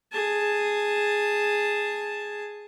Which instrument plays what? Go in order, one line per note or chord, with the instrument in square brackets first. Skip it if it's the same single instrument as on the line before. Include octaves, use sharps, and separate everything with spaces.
[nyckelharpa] G#4 A5